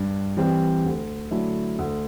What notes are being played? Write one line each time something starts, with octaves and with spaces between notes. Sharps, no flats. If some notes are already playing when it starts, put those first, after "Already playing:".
Already playing: G2
E3 G3 C4 G4
D2
D3 F#3 A3 E4
D2